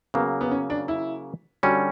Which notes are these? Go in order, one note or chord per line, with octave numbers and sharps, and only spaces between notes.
C#3 F#3 A#3 B3
B3
C#4
D4
E4
D3 G3 C#4 F#4